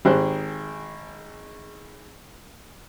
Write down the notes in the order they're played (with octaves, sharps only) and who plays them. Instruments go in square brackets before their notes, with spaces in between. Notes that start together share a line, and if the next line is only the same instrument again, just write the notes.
[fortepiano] G#1 G4 G#4 C5 F#6